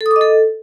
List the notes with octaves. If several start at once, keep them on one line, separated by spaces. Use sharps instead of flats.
A4
D#6
D6
D#5
A4